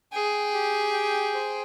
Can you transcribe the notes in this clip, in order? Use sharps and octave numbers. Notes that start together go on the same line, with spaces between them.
G#4 G5
G4
G5
C5